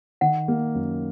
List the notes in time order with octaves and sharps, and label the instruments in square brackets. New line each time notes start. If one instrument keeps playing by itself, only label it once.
[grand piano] D#3 [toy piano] F#5
[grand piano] A#3
F#2